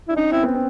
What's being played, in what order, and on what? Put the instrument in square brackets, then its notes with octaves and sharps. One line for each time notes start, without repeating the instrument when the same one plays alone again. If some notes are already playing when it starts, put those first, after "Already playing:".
[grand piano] D4 [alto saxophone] E4
[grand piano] C#4 [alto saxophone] D#4
[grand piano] C4 [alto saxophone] E4
[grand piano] B3
C4